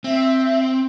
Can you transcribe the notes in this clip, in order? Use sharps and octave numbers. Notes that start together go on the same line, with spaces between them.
C4 E5